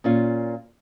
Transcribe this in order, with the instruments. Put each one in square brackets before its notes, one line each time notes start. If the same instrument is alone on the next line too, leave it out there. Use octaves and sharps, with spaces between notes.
[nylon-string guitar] A#2 C#4 F4